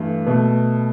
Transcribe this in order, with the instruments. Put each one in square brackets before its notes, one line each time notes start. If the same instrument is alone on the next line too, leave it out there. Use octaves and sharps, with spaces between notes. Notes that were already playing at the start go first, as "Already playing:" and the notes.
Already playing: [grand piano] G2 E3 A3
B2 A3